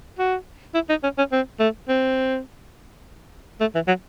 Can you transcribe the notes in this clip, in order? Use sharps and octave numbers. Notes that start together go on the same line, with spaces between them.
F#4
E4
D#4
C#4
C#4
C4
A3
C4
A3
E3
F#3